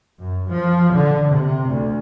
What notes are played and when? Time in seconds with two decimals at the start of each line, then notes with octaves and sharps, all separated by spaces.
0.20 F#2
0.48 F3
0.95 D3
1.30 C3
1.69 D2